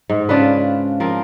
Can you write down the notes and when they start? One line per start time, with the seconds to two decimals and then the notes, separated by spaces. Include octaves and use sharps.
0.09 G#2
0.29 C#3 D4 F4 B4
1.00 F3 C4 A#4